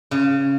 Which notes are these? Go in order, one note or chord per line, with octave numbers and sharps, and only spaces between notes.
C#3